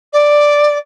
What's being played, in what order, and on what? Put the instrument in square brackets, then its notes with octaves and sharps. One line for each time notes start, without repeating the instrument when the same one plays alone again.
[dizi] D5